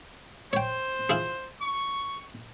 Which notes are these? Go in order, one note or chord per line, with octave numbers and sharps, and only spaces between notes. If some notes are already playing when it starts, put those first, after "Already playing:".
C5 C#5 G5
E4 F4 G#4
C#6